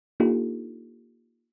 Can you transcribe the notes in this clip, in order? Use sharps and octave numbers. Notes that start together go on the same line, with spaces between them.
A#3 D4 D#4 F4 G4 A4